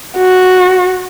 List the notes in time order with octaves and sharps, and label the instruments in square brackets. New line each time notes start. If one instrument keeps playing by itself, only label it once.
[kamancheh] F#4